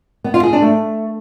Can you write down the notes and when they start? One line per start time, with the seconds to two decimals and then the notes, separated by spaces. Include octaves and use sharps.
0.24 B3
0.34 F4
0.43 G#4
0.53 D4
0.62 A3